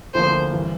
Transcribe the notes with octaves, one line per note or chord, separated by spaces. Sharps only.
D2 D3 F3 A#3 C5
G2 E3